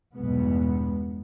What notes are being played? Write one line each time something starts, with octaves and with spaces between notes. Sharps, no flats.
B1 E2 G2 B2 G#3 B3